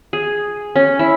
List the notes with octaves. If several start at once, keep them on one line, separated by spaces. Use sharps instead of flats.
G#4
C#4
E4